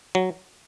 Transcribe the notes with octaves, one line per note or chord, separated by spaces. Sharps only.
F#3